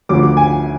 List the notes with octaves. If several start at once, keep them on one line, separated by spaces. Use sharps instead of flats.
D2 D3 F3 D6
D6
G#5